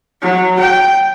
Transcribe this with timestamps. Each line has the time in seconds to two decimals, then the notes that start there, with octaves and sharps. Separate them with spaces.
0.22 F#3
0.60 G5